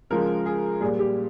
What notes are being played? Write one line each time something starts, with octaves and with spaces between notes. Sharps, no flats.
C#3 F3 G#3 A#4
G#4
A#2 G3 G#4
G4